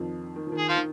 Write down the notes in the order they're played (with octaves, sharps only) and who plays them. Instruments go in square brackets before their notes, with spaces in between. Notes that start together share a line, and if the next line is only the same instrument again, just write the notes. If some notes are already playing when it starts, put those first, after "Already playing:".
Already playing: [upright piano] F2 D#3 F3
D#3
F3
D#3
[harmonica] G#4
F3 F4
[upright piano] D#3